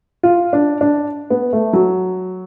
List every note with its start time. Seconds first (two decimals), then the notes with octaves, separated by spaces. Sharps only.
0.23 F4
0.53 D4
0.81 D4
1.30 B3
1.53 A3
1.73 F#3